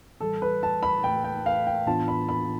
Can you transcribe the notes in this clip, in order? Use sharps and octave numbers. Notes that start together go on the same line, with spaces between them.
A2 E3 G3 A4
B4
A5
B5
A2 E3 A3 G5
G5
F5
G5
A2 E3 B3 D4 F4 A5
B5
B5